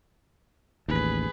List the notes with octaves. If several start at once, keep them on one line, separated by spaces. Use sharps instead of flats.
A1 D#2 G#4 B4